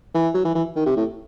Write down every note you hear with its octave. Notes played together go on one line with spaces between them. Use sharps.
E3
F#3
E3
E3
D#3
C3
A2